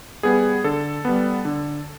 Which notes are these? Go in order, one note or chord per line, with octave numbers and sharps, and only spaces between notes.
G3 B3 G#4
D3 A4
G3 B3
D3